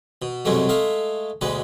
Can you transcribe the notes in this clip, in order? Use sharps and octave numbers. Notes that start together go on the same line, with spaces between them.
B2
C2 F#2 B2 G#3 A3
G#3 A3 F5
D2 B2 G#3 B4